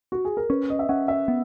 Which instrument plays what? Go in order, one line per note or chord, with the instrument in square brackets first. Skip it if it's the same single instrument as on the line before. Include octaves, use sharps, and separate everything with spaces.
[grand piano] F#4
G#4
A#4
[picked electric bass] C#4 [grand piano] B4
[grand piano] D#5
E5
[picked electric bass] C#4 [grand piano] F#5
[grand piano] E5
[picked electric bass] B3